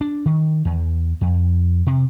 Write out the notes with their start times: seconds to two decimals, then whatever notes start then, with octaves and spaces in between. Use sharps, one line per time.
0.01 D4
0.26 D#3
0.65 E2
1.21 F2
1.86 C3